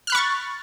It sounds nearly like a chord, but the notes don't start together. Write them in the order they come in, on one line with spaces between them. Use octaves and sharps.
F6 F#6 B5 C#6 A6